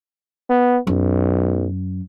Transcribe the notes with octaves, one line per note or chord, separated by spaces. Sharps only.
B3
B1 F#2